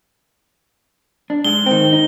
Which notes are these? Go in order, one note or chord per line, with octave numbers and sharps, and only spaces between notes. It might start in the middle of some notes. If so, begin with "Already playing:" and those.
D4
G#2 G#3 G7
D#3 C4
D#4